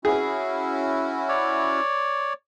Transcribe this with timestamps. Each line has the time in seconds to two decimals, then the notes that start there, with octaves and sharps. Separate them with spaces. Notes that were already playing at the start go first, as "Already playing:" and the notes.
0.05 C#4 E4 F#4 G#4
1.29 C#5 D5